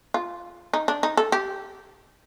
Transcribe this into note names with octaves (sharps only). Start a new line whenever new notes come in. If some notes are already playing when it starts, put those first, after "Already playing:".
F4
D#4
D4
D#4
A4
G4